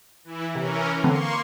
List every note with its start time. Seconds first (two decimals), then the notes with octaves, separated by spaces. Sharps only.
0.24 E3 E4
0.55 C3 E3 C#4 A#4
1.04 D3 E3 A#3 C4 C6 C#6